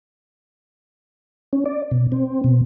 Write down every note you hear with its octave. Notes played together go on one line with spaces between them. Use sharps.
C#4
D5
B2
C4
B2